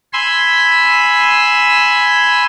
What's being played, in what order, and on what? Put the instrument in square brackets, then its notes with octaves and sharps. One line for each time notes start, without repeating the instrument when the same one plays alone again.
[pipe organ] G#5 B5 C6 E6